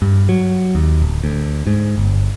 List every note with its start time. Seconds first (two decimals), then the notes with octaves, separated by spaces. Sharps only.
0.02 G2
0.29 F#3
0.75 D#2
1.02 D1
1.24 D2
1.67 G#2
1.98 G1